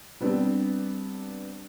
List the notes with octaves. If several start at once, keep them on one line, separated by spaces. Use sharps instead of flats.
G3 B3 C4 D4